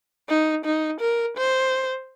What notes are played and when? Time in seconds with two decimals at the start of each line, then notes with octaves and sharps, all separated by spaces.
0.29 D#4
0.65 D#4
1.00 A#4
1.37 C5